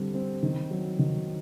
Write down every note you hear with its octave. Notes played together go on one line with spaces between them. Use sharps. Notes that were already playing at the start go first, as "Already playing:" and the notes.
Already playing: D3 G3 C4
C4
D#3
F#3
D#3